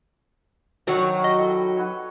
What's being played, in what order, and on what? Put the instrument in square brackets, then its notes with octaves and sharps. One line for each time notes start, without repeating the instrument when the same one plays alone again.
[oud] D#3 F#3 [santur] D4 F#5
[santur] G4 [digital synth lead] D#5
[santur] E4 A4 C#6
F#4 B4 C#5